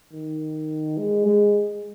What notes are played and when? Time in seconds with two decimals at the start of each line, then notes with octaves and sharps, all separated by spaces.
0.13 D#3
0.98 G#3
1.26 G#3